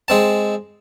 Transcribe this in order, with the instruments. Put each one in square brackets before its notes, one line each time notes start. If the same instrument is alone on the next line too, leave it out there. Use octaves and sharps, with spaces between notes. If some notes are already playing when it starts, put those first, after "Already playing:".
[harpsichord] G#3 C4 A5